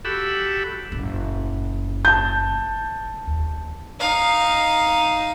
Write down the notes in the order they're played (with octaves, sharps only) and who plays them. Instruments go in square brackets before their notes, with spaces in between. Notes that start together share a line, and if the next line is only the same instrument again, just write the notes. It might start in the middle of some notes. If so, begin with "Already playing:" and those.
[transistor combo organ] F#4 G4 A4 B5 E6
[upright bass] F#1 A#2
[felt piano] A5 G6
[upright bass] D#2
[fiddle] D#4 F5